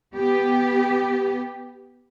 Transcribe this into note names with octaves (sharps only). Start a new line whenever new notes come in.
B3 G4